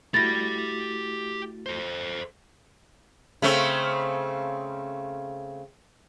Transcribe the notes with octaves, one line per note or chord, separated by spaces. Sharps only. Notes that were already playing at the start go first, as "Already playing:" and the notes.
A3 E4 F#4 G4 B5 A6 A#6
A4 C5
C#3 A3 C4